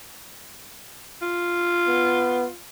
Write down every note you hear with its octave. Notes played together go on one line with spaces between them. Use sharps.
F4
B3